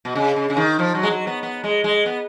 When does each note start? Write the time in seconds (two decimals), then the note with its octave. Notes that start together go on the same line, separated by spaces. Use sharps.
0.05 B2
0.15 C#3
0.36 C#3
0.50 C#3
0.57 D#3
0.79 F3
0.95 F#3
1.03 G#3
1.10 F#3
1.27 B3
1.43 B3
1.64 G#3
1.84 G#3
2.06 B3